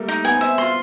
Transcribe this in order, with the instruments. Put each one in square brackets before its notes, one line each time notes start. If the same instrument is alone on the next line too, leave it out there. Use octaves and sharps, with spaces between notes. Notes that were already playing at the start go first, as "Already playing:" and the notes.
Already playing: [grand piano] G3 A3 A#3
[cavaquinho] D#4
[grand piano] B3 [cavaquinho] G#5
[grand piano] C4
[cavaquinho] E5
[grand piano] F4 [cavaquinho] C6